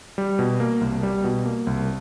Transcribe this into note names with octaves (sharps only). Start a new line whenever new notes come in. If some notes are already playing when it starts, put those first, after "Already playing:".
G3
B2
A#3
C2
G3
B2
A#3
C2